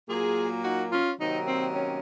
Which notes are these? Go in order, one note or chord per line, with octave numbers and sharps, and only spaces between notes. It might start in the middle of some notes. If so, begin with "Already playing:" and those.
A#2 F#3 A#3 F4 G#4
D#4 F#4
C#4 F4
C3 D#3 F#3 A#3 C4 D#4
C4
C#4